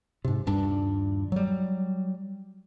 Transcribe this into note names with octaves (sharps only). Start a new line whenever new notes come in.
G#2 C3
D#1 G2 D4
F#3 G3